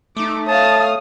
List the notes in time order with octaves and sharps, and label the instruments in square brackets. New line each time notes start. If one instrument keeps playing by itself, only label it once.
[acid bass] A3 [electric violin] D#4 D6
[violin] C#5 F5 [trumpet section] A5 [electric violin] D#6